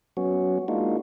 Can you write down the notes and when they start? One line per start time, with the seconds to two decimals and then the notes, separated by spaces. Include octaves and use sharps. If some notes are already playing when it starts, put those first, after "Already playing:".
0.17 F#3 B3 C#4 F#4
0.68 G#3 A#3 D4 D#4 F4 F#4